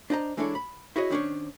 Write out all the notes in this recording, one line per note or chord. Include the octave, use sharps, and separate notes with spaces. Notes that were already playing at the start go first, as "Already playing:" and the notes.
D4 C5 D#5 A#5
E3 G#3 D4 E4 A4 C#5
B5
E4 F#4 G#4 C#5 D#5
D#3 C#4 D4 C5 C#5